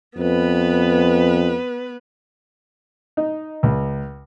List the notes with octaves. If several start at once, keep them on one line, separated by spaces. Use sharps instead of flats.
F2 B3 B4
D#4
C#2